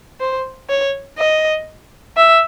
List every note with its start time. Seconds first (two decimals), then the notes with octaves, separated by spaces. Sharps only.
0.20 C5
0.70 C#5
1.18 D#5
2.17 E5